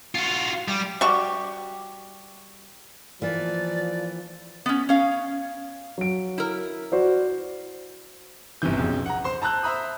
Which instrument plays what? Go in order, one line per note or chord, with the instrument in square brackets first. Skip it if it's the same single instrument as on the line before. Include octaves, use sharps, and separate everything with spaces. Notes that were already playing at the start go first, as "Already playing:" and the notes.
[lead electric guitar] F4 F#4
G3
[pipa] G3 F#4 G4
[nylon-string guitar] E3 A#3 [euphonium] F3 [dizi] D5
[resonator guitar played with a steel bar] B3 C#4
C#4 F5
[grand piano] F#3 D7
[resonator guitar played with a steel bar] E4 A#4
[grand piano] F#4 C5 D5
G1 C2 C3 E3 G6
B1 F2 C#3
F#5 A#5
C5 C6
A5 A#5 E6 F#6 G6
C5 E5 A#5 B5 D#6